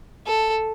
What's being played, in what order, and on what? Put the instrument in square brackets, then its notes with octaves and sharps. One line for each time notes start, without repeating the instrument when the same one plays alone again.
[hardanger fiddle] A4